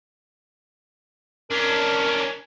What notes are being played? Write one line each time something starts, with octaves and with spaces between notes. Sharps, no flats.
C#4 D4 A#4